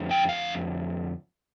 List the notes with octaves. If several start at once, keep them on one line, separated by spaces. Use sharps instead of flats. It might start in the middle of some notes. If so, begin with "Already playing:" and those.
Already playing: F2 D3 A3 D4 F4
G5
F5